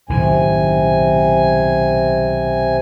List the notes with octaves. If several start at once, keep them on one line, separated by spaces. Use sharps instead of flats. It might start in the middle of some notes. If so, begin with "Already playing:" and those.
B1 A2 C3 D#3 G#5